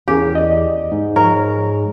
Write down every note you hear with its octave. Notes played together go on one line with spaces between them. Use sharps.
E2 C#4 G4 G#4 A#4
D5 D#5
G#2
G#2 F3 A#4 C#5